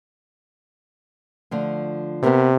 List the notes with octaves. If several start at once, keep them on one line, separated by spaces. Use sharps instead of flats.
D3 F3 A3
C3 B3 A#4 B4